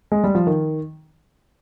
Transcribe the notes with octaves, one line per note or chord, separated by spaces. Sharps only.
G#3
G3
F3
D#3